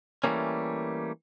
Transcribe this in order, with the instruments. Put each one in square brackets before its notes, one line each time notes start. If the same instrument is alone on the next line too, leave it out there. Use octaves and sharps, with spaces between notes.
[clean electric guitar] E3 F3 G3 A3 A#3 C#4